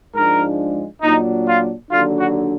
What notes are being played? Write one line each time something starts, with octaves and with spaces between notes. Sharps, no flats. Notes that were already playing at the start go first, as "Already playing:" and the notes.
G#2 F3 G#3 D4 A#4
A#2 F#3 D4 D#4
F4
D#2 D3 F#3 D4 F4
F#4